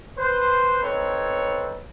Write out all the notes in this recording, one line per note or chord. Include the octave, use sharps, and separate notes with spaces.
B4 C5
C4 D#4 A4 B4 C#5